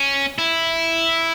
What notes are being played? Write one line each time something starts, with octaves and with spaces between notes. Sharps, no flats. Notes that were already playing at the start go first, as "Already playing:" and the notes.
Already playing: C#4
E4